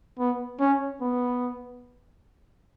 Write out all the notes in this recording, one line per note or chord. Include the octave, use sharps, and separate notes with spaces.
B3
C#4
B3